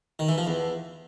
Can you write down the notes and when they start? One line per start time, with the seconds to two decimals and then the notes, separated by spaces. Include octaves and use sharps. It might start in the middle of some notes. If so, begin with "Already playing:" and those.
0.19 D#3
0.29 E3
0.38 F3
0.47 E2